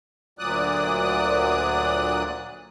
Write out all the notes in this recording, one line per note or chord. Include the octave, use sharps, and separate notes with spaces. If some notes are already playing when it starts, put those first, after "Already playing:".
D2 A#2 F#3 D5 D#6 F#6